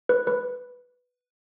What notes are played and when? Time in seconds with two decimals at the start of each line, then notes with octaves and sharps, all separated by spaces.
0.09 B4
0.27 B4